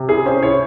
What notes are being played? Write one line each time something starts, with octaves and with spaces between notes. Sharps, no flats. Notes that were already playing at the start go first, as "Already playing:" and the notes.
Already playing: C3
E4 G#4
C#4 C5
E4 C#5